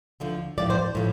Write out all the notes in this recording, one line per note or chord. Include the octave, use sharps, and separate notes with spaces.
D2 D3 F3
A2 F3 D5
C5
A2 F3